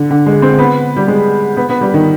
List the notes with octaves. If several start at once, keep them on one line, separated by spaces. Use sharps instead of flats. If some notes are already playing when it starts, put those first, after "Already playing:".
Already playing: D3
D3
G#3
C4
B3
G3
G#3
B3
B3
G3
D#3